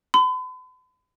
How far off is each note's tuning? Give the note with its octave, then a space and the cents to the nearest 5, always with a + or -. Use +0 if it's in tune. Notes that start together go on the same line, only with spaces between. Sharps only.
B5 +45